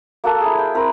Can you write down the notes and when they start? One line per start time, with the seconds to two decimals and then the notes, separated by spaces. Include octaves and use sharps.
0.24 A#3 F#4 A4
0.41 E4 G#4
0.58 G5
0.74 C4 E4 A#4